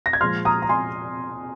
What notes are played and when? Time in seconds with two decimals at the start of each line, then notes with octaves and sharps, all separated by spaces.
0.06 A#6
0.13 G#6
0.21 A#2 F3 G#3 C6 F6
0.45 A#5 D#6
0.62 A#5
0.69 G#5 C6